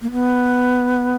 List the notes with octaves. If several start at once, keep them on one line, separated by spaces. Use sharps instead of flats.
A#3
B3